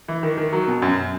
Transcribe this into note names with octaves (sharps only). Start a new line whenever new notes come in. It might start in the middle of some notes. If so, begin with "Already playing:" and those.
E3
D#3
D#3
F#3
B2
F#2